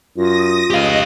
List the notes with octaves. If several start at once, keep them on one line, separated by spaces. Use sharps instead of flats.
F#2 F4 D#6 A#6
C#2 G4 D#5 F5